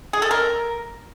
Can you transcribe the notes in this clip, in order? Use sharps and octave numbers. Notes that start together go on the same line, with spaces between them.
G#4
A4
A#4